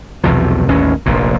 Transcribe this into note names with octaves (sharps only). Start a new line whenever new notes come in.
B1 E2 C3 F3
A1 D#2 C#4
F1 A#1 A#2